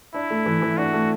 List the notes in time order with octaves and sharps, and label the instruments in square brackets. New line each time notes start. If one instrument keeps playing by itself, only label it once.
[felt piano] D4 [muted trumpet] E4
[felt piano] A3
E3
E3
[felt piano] D4 [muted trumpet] F#4
[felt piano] A3